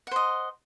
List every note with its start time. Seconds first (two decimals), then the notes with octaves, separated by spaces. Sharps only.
0.07 F#5
0.11 C5
0.16 D#5